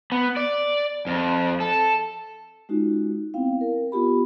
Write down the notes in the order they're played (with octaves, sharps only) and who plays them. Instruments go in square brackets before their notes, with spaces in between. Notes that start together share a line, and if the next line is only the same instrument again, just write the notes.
[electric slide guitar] B3
D5
F2
A4
[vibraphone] G#3 C#4 D#4 F4 F#4
B3 C4 E4 F5 G5
A#4
B3 F4 G4 B5